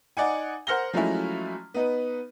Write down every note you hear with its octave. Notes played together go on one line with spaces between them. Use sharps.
D#4 D5 F#5 G#5
A#4 C5 F#5 F6 A#6 G7
F3 F#3 G#3 A3 C#4 E4
B3 D#4 B4